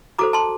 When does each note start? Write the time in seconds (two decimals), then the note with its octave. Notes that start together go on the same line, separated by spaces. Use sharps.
0.19 F#4 A4 C5 A#5 D6
0.33 A5 C6